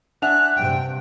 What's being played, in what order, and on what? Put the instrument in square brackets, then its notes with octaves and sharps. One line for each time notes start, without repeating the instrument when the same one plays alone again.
[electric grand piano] D4 E5 [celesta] F#5 G#5 F7 [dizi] F#6
[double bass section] G2 C3 [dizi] G5